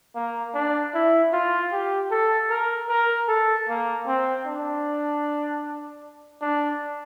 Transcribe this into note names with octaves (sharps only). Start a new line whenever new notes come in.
A#3
D4
E4
F4
G4
A4
A#4
A#4
A4
A#3
C4
D4
D4